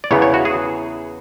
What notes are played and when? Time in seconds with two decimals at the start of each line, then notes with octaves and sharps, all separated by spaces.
0.04 D5
0.11 E2 C#3 E3 B3 C#5
0.22 C#5
0.34 F#4
0.45 G#4